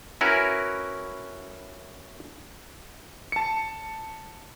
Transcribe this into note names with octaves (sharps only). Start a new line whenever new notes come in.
C#4 E4 F#4 A#4 B4
A5 C#7